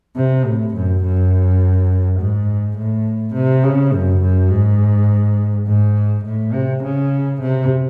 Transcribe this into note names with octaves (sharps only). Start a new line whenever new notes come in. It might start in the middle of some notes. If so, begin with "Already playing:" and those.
C3
A2
F#2
F#2
G#2
A2
C3
C#3
F#2
F#2
G#2
G#2
A2
C3
C#3
C3